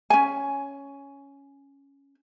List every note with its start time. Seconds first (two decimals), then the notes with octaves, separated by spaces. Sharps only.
0.10 C#4 G#5